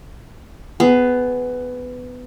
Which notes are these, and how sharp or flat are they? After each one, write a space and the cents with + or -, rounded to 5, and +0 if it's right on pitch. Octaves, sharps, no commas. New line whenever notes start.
B3 +15 G#4 +0